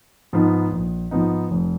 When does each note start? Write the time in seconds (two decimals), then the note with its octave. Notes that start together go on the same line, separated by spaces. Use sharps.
0.33 G#2 F3 B3 D#4
0.72 A#1
1.11 G#2 F3 B3 D#4
1.51 F1